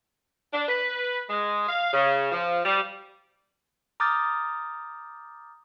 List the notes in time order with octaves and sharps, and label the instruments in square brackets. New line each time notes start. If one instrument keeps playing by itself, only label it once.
[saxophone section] D4
B4
G#3
F5
C#3
F3
G3
[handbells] A#5 D6 D#6 F6 G6 A6